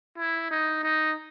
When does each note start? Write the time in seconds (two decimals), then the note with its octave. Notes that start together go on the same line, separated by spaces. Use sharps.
0.18 E4
0.51 D#4
0.83 D#4